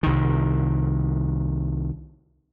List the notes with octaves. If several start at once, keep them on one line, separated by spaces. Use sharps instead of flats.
C2 D#3